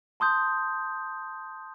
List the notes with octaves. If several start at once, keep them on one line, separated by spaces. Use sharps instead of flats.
A5 C6 D#6 G6